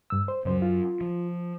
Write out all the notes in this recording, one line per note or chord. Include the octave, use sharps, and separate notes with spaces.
G2 E6
C5
C#2 F#2 F#3 C5
F4
F3